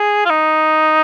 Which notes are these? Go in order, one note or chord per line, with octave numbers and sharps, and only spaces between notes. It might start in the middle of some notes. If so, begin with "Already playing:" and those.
Already playing: G#4
F4
D#4